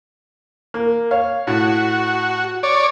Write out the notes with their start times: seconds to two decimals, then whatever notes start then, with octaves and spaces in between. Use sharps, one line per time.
0.74 A#3
1.11 C#5 F5
1.47 A2 F#4
2.63 C#5 D5